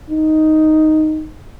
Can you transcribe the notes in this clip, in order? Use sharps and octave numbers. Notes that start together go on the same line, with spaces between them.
D#4